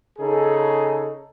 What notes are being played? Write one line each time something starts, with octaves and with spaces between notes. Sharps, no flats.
C#3 D#4 G#4 A4